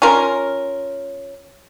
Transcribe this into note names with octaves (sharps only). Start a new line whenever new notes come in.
C#4 F4 A#4